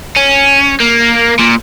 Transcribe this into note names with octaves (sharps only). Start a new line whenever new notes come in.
C#4
A#3
A#2